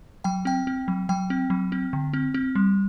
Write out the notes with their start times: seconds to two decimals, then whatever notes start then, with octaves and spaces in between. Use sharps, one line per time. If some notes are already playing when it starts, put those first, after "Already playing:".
0.24 F#3 G5
0.45 C4 G5
0.67 C4
0.88 F#3
1.09 F#3 G5
1.30 C4
1.50 F#3
1.72 C4
1.93 D3
2.13 C4
2.34 C4
2.55 G3